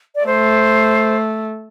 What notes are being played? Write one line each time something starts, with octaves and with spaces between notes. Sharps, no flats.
D5
A3 C5